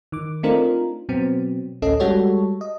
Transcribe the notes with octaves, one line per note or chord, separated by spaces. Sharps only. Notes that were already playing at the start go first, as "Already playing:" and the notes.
D#3 D6
A3 C4 D4 D#4 F4 A#4
B2 F#3 B3 C4
A1 D2 C#4 A4 D#5
G3 G#3 F#4 A4 C#5
D#5